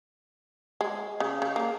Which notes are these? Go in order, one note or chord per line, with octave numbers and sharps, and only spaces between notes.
G#3
C#3
C#3
A#3